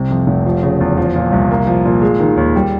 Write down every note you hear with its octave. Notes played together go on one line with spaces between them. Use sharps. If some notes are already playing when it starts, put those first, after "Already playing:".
Already playing: C2 C3
F2
F1
F3
C#3
E2
F3
A#2
C2
A#3
F3
A#2
G#3
D#3
D#2
G3